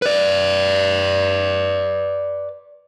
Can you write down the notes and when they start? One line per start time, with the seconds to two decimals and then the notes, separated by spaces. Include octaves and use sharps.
0.02 B4 D5